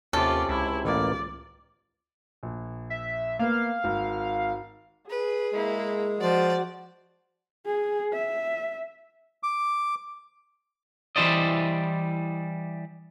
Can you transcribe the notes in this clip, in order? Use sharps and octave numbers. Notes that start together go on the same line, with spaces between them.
D#2 C3 C#4 F4 A4 D5
C#2 E4
A1 A#3 D5
A#1
E5
A#3 B3 F5
G#1
G#4 B4
G#3 A#3 E4
F3 F#4 D5
G#4
E5
D6
E3 G3 E4 C5 D5 D#5